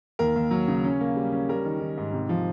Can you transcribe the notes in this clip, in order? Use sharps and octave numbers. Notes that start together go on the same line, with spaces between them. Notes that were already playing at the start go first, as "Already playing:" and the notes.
D#2 A#4
D#2
F#3
C#3
C#4
A#3
G3
C#4
G3 A#4
D#3
D#3
G#2
C3
F3